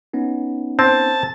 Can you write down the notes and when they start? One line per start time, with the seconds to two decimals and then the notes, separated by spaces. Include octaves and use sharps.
0.13 B3 C#4 D#4
0.79 C4 A5